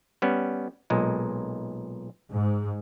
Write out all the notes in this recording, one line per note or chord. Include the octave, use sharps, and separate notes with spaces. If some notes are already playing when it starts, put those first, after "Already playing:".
G3 B3 C#4
B1 A#2 G#3
G#2